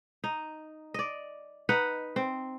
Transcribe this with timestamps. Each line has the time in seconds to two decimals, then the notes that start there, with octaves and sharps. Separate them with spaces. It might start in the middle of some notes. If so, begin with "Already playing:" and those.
0.24 D#4
0.94 D5 D#5
1.69 D#4 B4 F#5
2.16 C4